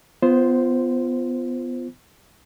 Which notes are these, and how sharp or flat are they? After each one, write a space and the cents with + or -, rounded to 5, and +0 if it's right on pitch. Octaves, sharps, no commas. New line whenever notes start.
B3 +20 F4 -15 C5 +0